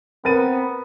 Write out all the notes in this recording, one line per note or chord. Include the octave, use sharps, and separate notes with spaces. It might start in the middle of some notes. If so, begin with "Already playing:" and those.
B3 C4 A#4 A6 D#7